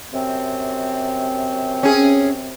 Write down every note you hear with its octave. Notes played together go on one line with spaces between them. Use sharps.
F#2 C3 C4
C#4 G#4